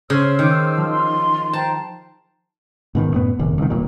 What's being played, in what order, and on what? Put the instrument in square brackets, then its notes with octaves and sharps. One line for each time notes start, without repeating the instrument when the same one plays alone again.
[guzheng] C#3 [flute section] C5 E6 F6
[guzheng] D#3 [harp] D6 C#7
[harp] F3 [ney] A5
[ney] C6
[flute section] C5 G5 A#5 [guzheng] A5
[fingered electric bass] G#2 B2 D#3
F#2 A2 B3
F1 A#1 D#2
C2 D#3
D#1 A#1 G2 A#2